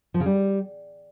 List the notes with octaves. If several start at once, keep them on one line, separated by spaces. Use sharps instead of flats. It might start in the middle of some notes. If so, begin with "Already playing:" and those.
F3
C#3
G3